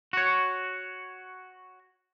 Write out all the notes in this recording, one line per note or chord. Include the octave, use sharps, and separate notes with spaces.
F#4 C#5